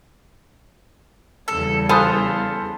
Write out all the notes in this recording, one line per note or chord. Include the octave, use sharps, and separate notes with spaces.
E2 C#3 G3 A4
F4 A4 C5 G#5 B5 D#6 F#6